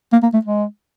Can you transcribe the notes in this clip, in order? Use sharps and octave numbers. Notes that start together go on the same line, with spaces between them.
A#3
A#3
A3
G#3